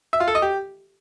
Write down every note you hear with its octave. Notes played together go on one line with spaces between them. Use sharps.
E5
F4
A4
D#5
G4